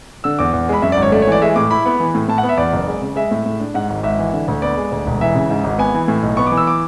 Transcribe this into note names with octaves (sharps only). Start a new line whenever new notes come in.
D3 E6
E2 D6
E2
G#3 B5
F#2 E5
D5
G#1
C#5
A3 D5
C#5
E3 D5
G#3 E5
A2 D6
E4 B5
B3
E3
A2
A2 A5
F#5
B3
E5
E2 D5
F#1
G#3
C#3
G#3 E5
A2
A2
D4
G#2 F#5
G#1
G#1 E5
E3
D3
D2
B3 D5
G#3
D2
E1
E3 E5
C#3
G#2
G#1
B3 G#5
E3
A2
B1
B3 C#6
D6
E3
E6
D6